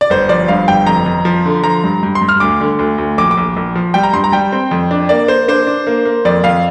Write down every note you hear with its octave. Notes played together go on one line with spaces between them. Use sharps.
D5
G1 C5
F3 D5
G2 F5
G1 G5
F2 A#5
F2
F3
D3
F3 A#5
G2
G2
C6
G2
F6
D2 D6
D3
D2
D2
A#1 D6
D6
A#1
A#1
F3
G3 G5
A#5
G2 C6
A#5
G3 G5
C4
F2
D4
A#3 D5
A#3 C5
D4 C5
D4
A#3
A#3
F2 D5
F2 F5